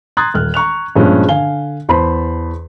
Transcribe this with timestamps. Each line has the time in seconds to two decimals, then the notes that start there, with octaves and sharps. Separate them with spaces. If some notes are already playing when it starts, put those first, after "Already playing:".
0.17 A#5 C6 D#6 F#6 G#6 A6
0.34 D#1 F6 F#6
0.54 A#5 C#6 F#6 F7
0.96 G2 A#2 F3 G#3 C#4 D4
1.29 D3 F5 G#5 G7
1.89 E2 C5 A5 B5 C6